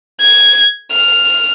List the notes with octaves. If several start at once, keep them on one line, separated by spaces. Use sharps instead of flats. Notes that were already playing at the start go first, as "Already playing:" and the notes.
G#6
F6